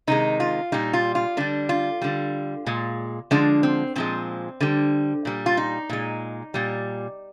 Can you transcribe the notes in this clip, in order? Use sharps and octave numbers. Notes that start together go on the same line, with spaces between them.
C3 D#3 G#3 D#4
F4
A#2 G3 D#4
F4
F4
D3 G3 D4
F4
D3 G3
A#2 G#3
D3 F3 G#3 D4
C4
A#2 F3 G#3 C4
D3 G3
A#2 G3
F4
D#4
A#2 G#3
A#2 G3